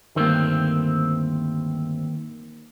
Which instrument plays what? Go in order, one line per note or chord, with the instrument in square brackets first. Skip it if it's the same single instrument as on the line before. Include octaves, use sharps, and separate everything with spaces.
[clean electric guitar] D2 G2 C4 [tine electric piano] D#3 A#3